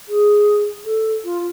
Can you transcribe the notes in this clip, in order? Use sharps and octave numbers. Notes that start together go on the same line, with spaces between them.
G#4
A4
F4